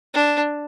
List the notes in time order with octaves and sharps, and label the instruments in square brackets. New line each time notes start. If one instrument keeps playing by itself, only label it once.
[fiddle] D4